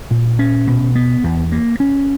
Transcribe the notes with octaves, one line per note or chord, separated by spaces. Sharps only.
A#2
C#4
B2
B3
E2
A#3
C#4